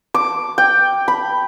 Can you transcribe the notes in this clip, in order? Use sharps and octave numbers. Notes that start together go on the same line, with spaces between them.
D6
G5
B5